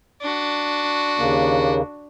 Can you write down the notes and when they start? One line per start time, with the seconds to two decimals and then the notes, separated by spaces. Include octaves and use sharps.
0.21 D4 F#4
1.19 D#2 C#3 A#3